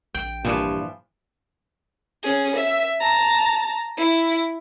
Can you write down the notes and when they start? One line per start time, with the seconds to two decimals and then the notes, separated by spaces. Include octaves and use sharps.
0.15 A#1 G5
0.45 G2 A#2 E3 F3
2.23 C#4 G#4
2.56 E5
3.00 A5 A#5
3.97 E4